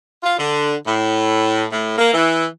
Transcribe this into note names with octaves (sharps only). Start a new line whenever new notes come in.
F4
D3
A2
A2
A#3
E3